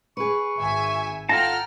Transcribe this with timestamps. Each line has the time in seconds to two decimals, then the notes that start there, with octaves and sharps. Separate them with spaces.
0.17 G#4 B4 C#6
0.59 G#1 E5 G#5
1.29 F4 A4 F#5 G5 A5 A#5 F6